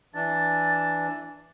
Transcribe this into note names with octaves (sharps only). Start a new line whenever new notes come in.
E3 D4 A6